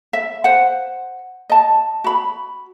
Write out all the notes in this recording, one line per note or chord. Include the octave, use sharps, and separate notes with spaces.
E5
C5 F#5
D#5 A5
F#4 B5